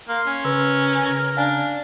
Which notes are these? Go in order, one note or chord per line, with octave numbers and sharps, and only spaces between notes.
A#3 F5 C6
C#4
C#3 A#4 B4 E6
C#3
D4 F5 G#5